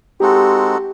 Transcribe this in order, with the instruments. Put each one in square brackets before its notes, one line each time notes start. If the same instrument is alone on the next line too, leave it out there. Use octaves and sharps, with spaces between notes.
[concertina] G#3 C4 D#4 F#4 A4 [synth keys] G4